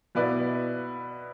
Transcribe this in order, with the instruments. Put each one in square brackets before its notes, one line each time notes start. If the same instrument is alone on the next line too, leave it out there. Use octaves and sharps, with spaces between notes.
[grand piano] B2 B3 E4 B4 D5